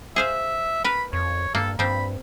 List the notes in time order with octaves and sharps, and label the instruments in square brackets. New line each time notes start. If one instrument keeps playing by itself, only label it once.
[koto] G#4 C5 F5 [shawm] E5
[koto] A#4 B4 [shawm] B5
[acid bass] F2 [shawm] C#5
[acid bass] G2 [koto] A#3 [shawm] A4
[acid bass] G2 [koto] F3 C4 [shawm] B5